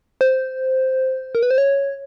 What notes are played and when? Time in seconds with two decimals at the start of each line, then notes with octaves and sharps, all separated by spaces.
0.21 C5
1.35 A#4
1.43 B4
1.51 C5
1.58 C#5